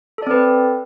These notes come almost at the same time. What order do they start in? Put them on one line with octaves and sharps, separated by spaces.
A4 D5 C4 B4